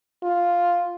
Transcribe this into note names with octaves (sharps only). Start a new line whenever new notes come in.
F4